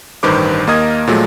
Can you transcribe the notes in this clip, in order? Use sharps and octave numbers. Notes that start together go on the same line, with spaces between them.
A1 G2 D#3 B4 C5 D6
D#2 A#3 A#4 D#5 D#6 G#6
A#2 F3 F#3 G#3 A3